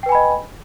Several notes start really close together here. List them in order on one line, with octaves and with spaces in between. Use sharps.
G5 B4 G#5 B5 D#5